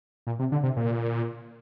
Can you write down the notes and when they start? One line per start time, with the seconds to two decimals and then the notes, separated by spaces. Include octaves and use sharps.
0.27 A#2
0.39 C3
0.52 D3
0.63 C3
0.77 A#2